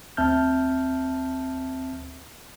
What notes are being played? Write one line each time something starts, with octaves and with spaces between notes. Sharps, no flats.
D2 C4 E5 A5 F6 G6